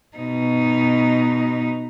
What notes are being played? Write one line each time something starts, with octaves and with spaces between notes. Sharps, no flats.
B2 D#4